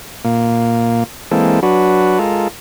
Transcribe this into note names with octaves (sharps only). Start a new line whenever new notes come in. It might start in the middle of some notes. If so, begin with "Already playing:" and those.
A#2 A#3
E3 G#3 A#3 C4 A4
F#3 D4 F#4 B4
G#3 F4 A4 A#4